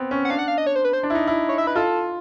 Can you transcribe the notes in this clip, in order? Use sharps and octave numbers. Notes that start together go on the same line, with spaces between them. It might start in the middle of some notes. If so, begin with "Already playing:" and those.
Already playing: B3 C4
C#4
F#5
D4 F5
F#5
F5
D#5
C#5
C5
B4
C5
D4
E4
D#4
E4
C#5
E5
B4
F4 A4